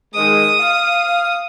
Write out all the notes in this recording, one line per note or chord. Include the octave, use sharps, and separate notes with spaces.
D#3 G#3 D#6
F5